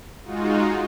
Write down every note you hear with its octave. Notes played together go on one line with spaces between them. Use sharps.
G#3 D#4 F4 F#4